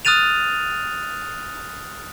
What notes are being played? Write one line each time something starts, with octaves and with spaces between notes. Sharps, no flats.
D#6 F6 F#6 A6 D#7 F7